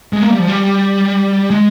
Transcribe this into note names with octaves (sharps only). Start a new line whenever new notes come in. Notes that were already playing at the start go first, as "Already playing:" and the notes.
G#3
A#3
G3
F3
G3
G#3